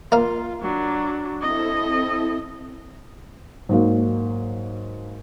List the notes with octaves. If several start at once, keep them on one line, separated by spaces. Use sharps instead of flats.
A#3 F4 F5
F#3 D4
C4 E4 A4 D#5
G#2 F#3 A#3